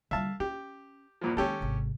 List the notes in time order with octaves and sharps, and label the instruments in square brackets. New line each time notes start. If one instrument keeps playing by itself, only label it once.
[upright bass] D3 G3 [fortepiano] E5 F5 A5
[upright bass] C#4 [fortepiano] G4
[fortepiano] E2 A#2 F3
[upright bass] D#3 G#3 [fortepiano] C#4 G4 A4
[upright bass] G#1 C3